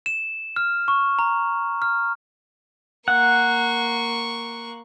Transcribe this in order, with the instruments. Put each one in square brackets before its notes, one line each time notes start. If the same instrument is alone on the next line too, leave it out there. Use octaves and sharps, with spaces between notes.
[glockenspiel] E7
F6
C#6
A#5
F6
[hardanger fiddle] A#3 C#6 [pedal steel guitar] F#5